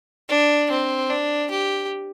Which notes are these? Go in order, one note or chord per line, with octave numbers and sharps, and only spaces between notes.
D4
C4
D4
G4